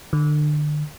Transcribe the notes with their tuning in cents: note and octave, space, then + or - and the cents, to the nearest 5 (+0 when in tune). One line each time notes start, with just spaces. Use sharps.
D3 +35